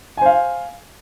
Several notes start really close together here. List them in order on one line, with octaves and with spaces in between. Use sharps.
G#5 C5 F5